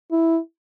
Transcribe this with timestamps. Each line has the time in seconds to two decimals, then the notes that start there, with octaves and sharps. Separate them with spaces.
0.12 E4